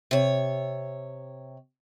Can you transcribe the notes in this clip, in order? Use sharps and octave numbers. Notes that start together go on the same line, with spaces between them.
C3 C#5